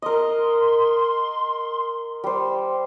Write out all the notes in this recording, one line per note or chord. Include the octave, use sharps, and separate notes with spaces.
A#4 D#5 C6
G3 C5